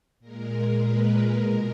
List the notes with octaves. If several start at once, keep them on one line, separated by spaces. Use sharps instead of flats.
A#2 G#3 A#4
B4
B2 G#3 A#4